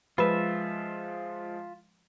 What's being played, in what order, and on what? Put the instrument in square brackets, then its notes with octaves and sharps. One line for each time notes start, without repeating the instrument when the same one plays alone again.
[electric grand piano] F3 G#3 [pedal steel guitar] F4 E5 [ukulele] B4